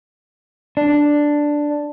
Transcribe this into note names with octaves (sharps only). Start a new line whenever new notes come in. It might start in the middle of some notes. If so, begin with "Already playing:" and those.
D4